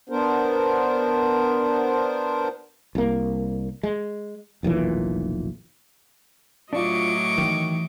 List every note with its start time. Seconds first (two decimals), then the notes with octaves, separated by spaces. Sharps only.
0.09 B3 D4 A#4 C5
2.95 C2 A#3
3.83 G#3
4.63 F1 B1 A#2 E3
6.73 A2 F#3 D4 F4 D#5 C#6 D6
7.38 D#3 E3